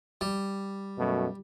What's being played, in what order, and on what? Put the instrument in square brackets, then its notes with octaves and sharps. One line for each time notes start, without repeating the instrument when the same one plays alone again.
[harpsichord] G3
[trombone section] F#2 B2 A3